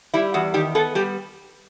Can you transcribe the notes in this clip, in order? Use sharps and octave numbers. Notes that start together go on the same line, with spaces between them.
G3 E4
E2 F#4
D#3 G4
B3 A4
G3 G4